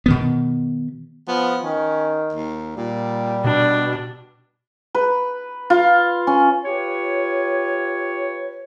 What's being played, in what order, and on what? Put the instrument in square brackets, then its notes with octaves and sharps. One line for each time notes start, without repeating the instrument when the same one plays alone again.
[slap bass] B2 D#3 B3
[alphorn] F3 [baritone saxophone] B3
[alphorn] D#3 [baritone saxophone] C#4
[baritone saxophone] D#2
[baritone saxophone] A#2 [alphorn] G3
[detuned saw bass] B2 [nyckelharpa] D4
[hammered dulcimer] B4
F4
C#4
[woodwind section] F4 G4 B4 C#5